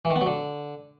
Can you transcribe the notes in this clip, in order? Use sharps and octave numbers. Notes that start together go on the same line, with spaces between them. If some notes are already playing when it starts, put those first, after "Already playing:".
E3
D#3
B3
F#3
D3